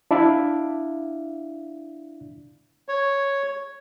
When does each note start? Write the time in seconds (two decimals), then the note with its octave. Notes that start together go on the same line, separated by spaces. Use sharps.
0.11 D4 E4 D5 E5 F5
2.89 C#5